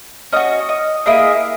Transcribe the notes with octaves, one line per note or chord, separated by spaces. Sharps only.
C#4 F#4 D#5
D#5
A#3 E4 G#4 D#5